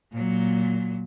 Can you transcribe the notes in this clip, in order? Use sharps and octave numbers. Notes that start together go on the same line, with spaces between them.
A#2 F#3